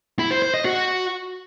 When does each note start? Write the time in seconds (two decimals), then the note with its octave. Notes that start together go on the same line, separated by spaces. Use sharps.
0.19 E4
0.31 C5
0.42 C5
0.54 D#5
0.65 F#4